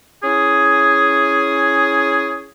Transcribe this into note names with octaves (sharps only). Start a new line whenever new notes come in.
C#4 E4 G#4